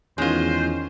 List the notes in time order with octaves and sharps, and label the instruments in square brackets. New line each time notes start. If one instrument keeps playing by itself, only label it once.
[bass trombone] E2 [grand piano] D#3 C#4 [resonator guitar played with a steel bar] G#3 F4 [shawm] C5